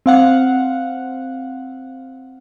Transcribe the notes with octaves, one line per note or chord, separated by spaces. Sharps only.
C4 F5 F#5